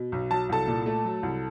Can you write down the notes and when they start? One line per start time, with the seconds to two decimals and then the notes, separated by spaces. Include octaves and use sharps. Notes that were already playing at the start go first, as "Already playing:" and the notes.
Already playing: B2
0.12 B1
0.31 F#3 A5
0.49 C2 A4 A5
0.68 A#2
0.86 A3
1.04 F#3
1.23 C2